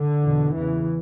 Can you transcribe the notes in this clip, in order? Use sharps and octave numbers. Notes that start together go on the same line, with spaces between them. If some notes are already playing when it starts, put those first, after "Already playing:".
Already playing: D3
E2 B2
E2 C#3 E3